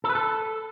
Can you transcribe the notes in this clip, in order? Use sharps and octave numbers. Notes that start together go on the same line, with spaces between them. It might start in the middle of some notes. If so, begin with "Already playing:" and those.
A4
B4
A4